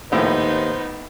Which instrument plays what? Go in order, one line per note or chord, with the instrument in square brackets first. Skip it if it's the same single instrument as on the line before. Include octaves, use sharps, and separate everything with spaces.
[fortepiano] A#1 A2 [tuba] D#2 [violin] B3 D#4 [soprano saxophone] C5